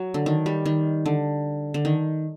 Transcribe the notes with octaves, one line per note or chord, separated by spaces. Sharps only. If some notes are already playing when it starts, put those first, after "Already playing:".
Already playing: F#3
D3
D#3
G3
D#3
D3
D3
D#3